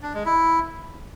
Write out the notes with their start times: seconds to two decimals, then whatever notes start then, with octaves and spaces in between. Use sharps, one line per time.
0.03 D4
0.14 G#3
0.26 E4